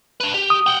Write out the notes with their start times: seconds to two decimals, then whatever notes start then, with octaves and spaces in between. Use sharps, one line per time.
0.20 D4 B4
0.34 G4
0.50 D#6
0.66 F#5 G5